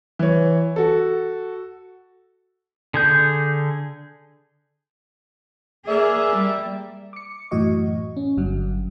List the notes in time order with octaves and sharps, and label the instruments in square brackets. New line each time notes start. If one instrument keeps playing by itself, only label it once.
[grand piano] E3 C#5
F#4 A4
[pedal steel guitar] D3 G#4 G6
[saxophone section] A#3 D5 E5 [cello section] G#4
[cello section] G3
[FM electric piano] D6 C#7
F#2 A2 E3 F#4 D#5 C#6
C#4
G1 G2 F#3